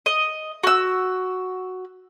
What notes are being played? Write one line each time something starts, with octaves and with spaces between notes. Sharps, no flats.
D#5
F#4 E6